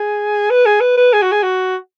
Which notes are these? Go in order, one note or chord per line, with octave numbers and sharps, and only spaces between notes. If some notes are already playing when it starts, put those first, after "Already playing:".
Already playing: G#4
B4
G#4
B4
B4
G#4
F#4
G#4
F#4